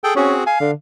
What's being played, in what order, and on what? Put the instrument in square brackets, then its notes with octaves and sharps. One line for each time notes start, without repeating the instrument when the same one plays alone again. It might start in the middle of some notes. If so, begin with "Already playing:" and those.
[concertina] G#4 A4 G5
[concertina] C4 F#4 G#4 [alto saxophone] C#4
[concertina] F5 [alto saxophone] G#5
[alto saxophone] D3